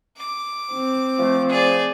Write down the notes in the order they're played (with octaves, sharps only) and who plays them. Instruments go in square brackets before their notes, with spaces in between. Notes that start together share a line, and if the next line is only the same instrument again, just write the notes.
[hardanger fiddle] D6
[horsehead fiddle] C4
[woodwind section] F3 A3
[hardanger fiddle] G#4 D5